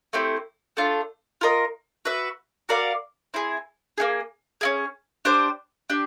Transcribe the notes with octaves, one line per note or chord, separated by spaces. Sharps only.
A3 C4 E4 G4
A3 D4 F4
F4 A#4 D#5
F#4 B4 E5
F#4 A#4 D5 F5
C4 E4 G#4
A#3 D#4 G#4
C#4 E4 G#4
D4 G4 C5
D4 G4